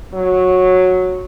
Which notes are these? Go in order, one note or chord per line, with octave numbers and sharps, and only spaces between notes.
F#3